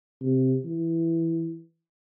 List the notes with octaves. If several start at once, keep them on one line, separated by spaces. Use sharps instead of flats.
C3
E3